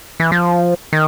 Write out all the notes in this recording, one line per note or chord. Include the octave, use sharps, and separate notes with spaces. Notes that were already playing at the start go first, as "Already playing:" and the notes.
E3
F3
D#3